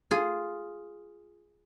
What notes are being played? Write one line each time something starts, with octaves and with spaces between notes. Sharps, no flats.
F4 G#4